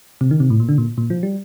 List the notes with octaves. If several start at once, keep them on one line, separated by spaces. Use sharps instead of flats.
C3
D#3
C3
A2
A#2
D3
A#2
A#2
F3
G3